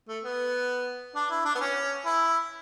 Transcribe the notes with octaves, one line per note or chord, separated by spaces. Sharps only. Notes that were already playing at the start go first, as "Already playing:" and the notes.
A3
B3
D4
E4
D4
B3
C#4
E4